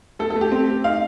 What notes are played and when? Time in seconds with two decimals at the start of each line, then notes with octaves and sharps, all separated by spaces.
0.19 A3 A4
0.30 A4
0.36 A3
0.41 G4
0.52 C4
0.68 A3
0.84 D#4 F5